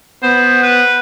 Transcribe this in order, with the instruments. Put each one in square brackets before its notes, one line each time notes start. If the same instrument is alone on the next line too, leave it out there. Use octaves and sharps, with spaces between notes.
[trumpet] B3 [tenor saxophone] C5
[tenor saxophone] B4